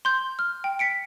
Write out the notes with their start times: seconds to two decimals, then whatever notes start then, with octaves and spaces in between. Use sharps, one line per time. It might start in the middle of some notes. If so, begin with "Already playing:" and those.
0.05 C6 G6
0.39 F6
0.64 G5
0.79 B6 C#7 D7